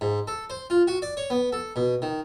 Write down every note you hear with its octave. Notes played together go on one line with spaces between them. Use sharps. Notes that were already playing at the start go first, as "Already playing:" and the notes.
G#2
A4
C5
F4
F#4
D5
C#5
B3
A4
B2
D#3